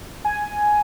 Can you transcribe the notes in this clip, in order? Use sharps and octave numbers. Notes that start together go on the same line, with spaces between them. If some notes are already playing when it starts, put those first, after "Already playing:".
G#5